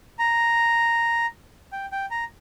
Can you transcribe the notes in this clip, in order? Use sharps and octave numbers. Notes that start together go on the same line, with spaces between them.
A#5
G5
G5
A#5